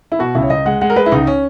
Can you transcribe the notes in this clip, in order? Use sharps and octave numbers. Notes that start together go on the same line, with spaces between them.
E4
B2 F#4
C#2 E4
C#5
C#2 D#5
G#3 F#5
G#3 F#5
A#4
G#3 B4
E4
C#2 D#4
C#4